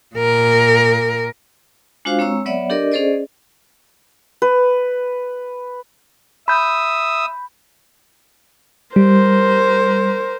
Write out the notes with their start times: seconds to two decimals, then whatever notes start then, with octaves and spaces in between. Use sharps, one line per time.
0.16 A#2 A#4
2.05 G#3 D4 F4 F#4 C5 F5
2.19 G#3 C4 C#5 A#5 C#6 E6
2.46 F#3 B3 C#5 D5 E5 F#5
2.70 D4 G4 A4 A#4 D5 D#5
2.91 C#4 G#4 A4 C5 D5 D#5
4.42 B4
6.48 E5 B5 D#6 E6 G6
8.96 G3 A#4 C5